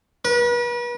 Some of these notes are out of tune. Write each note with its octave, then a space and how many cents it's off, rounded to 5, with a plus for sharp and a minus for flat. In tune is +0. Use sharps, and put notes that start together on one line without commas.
B4 -40